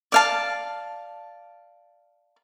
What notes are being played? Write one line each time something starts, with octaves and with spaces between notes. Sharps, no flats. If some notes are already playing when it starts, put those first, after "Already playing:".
D5 F5 A5